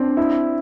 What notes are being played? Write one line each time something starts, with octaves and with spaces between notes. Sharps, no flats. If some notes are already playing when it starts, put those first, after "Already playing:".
Already playing: C4 D4
E4